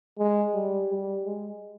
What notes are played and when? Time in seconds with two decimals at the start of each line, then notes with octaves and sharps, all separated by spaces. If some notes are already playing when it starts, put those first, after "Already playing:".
0.19 G#3
0.54 G3
0.90 G3
1.26 G#3